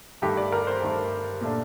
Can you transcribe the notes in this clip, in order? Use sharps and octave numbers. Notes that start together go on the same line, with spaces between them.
G2 D#3 A3 G4
D5
A#4
C5
G2 D#3 A3
A#2 A3 D4